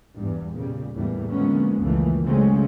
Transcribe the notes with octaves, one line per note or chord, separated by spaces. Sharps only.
E2 G2
A#2 C#3 G3
E2 A2 E3 G3 A#3
D3 F3 G#3 A#3 B3 C#4
C#2 F#2 D#3 E3 A3 A#3
C#3 F#3 G#3 A3 C4 C#4